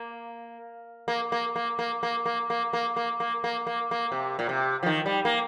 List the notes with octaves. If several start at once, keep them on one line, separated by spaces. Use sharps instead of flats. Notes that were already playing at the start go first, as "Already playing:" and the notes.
Already playing: A#3
A#3
A#3
A#3
A#3
A#3
A#3
A#3
A#3
A#3
A#3
A#3
A#3
A#3
C3
A#2
C3
F3
D#3
G3
A#3